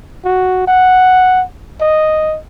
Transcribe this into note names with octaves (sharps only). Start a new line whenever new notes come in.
F#4
F#5
D#5